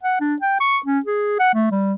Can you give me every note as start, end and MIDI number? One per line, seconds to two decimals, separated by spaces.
0.03 0.16 78
0.20 0.35 62
0.42 0.55 79
0.60 0.78 85
0.86 0.99 61
1.06 1.38 68
1.39 1.54 78
1.54 1.71 57
1.71 1.94 55